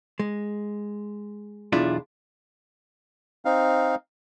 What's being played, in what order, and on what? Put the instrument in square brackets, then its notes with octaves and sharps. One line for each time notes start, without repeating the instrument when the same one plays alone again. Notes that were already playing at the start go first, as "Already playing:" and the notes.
[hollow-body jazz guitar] G#3
B1 E2 D4 E4 F4
[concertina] C4 D#4 F5